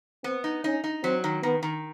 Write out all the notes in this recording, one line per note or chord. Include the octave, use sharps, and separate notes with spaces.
B3 C4
D#4
C#4 D#4
D#4
F#3 C4
D#3
D#3 B3
D#3